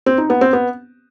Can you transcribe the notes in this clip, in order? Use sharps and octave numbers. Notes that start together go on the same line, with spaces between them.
C4
D#4
B3
C4
B3